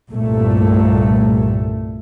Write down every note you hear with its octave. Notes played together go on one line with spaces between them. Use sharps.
C2 G2 A#2 A3